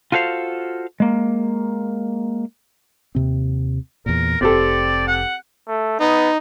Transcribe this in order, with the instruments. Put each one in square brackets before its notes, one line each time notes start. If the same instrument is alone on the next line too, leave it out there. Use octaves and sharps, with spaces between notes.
[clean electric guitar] F4 F#4 A4 C5 F5
G#3 A#3
[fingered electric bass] D#2 C3 C4
[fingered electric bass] E2 A#2 [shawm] A#4
[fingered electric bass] F1 [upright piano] C4 G4 A4 [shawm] D5
[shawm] F#5
[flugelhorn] A3
[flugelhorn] B3 [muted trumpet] D#4